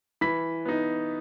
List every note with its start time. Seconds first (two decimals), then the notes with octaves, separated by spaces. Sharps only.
0.21 E3 B5 B6
0.65 B3 D#4